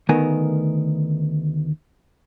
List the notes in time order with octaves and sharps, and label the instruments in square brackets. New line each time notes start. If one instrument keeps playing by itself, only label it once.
[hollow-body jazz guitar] D2 D#3 A3 B3 A#4 G#5